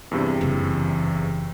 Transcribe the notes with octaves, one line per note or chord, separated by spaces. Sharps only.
E2 G2 C3
F#1 E3